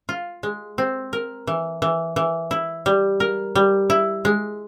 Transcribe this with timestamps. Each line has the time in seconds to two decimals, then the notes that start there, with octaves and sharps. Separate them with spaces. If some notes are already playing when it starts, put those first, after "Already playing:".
0.09 F4
0.43 G#3
0.78 C4
1.13 A#4
1.47 E3
1.82 E3
2.16 E3
2.51 E4
2.86 G3
3.20 A#4
3.55 G3
3.90 E4
4.25 G#3